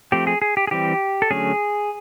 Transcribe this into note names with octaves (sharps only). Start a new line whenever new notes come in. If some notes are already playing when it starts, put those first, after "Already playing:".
F3 A3 C4 G4
G#4
G#4
G4
G#4
E3 G3 C4 G4
A4
D3 F#3 A3 C#4 G#4